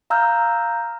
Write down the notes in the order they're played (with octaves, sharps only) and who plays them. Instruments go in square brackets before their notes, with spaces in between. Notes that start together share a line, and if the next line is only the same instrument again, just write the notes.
[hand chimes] F5 A#5 E6 F6 G6